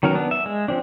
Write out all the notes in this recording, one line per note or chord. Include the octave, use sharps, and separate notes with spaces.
D#3 F#3 B3 C#4 A#4
B3 D4
E5
G#3
F3 C4 D4